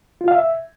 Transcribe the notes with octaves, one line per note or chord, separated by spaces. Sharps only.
F4
F5
E5